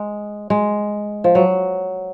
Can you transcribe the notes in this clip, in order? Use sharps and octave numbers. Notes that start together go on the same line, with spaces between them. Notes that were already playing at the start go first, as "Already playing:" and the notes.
Already playing: G#3
G#3
F3
F#3